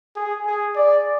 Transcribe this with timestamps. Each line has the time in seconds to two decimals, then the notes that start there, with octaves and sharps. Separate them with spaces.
0.16 G#4
0.46 G#4
0.75 D5